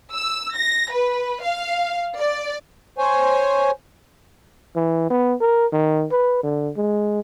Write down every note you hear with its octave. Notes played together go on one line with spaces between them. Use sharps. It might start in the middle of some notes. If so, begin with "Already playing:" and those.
E6
A#6
B4
F5
D5
C5 C#5 G#5
E3
B3
A#4
D#3
B4
D3
G#3